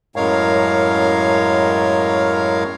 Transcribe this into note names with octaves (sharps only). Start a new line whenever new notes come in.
F#2 A2 G#3 A#4 C#5 F5